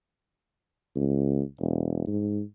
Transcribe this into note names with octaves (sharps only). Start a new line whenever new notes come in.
C#2
E1
G#2